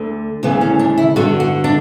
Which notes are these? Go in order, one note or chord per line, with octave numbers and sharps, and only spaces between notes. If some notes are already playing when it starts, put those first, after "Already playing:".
Already playing: D2 D3
D2 C#3 E3 B3
C#4
D4
E4
G2 D3 F#4
F#4
D4